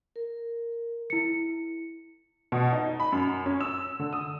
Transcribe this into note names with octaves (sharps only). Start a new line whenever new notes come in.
A#4
E4 C#7
B2
D#4
B5
F#2
C#4
E6
D3
D#6